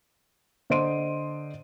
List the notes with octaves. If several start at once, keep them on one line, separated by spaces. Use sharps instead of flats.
D3 C5 D#5 C6 D7 D#7